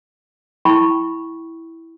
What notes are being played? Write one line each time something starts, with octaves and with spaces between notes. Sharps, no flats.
E4 G5 B5 C#6